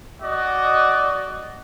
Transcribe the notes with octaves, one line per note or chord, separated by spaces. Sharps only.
F#4 D5 D#5